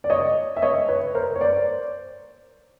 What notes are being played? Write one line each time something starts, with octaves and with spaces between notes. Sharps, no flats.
D5
C#5 D#5
E5
C#5 D#5
B4 C#5
A#4 C5
C#5
C5 D5